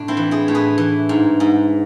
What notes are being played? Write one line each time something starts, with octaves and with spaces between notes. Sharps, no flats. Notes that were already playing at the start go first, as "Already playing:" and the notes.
Already playing: A2 D4
C4 E4
E3
E4 G#4
A2
G#4 B4
E3
G#2
G#2